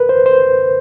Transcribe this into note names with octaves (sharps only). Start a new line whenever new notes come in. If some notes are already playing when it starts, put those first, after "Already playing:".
Already playing: A#4 B4
C5
C5